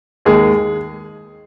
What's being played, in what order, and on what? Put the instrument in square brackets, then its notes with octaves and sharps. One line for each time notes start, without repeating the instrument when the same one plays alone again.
[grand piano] D#2 D#3 G#3 G#4